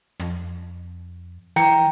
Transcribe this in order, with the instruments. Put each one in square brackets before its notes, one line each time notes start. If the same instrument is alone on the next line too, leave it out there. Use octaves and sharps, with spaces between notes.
[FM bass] F2
[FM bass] E3 [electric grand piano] G5 A#5 C#7